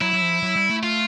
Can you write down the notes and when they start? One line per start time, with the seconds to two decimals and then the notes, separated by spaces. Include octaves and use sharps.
0.01 F#3 E4
0.13 F#3
0.22 F3
0.43 F#3
0.56 G3
0.70 A3
0.83 F4